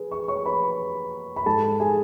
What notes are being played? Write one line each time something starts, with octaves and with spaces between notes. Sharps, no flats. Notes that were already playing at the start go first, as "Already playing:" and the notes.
Already playing: G#4 B4
C#6
C#5 C#6
B4 B5
B5
G#2 A4 A5
G#4 G#5